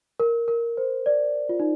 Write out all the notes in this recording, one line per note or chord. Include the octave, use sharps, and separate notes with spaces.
A#4
A#4
C5
D5
F4
D#4